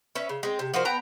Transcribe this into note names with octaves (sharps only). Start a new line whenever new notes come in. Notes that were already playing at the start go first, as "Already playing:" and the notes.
C#4 B4 E5
C#3
G#3 C4
C3
F3 F#4 A#4 C5
B3 G5 A5 A#5